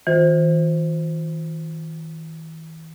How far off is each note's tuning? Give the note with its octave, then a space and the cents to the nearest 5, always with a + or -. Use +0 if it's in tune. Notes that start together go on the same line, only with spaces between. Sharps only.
E3 -45 F4 +35 C5 +0